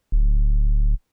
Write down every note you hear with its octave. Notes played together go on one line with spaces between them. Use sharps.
D1